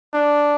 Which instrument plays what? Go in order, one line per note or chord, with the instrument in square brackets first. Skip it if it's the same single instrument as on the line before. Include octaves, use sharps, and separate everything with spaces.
[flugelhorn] D4